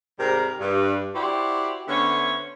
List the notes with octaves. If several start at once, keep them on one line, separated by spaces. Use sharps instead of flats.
G#2 C3 G3 A#4
G2
E4 F#4 G4 C5 D5
D3 B3 C#4 C5 C#5 E5